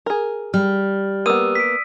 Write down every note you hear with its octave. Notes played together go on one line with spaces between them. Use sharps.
G#4 A#4
G3 F6
A#3 B3 D#6 E6 D#7
B6 D7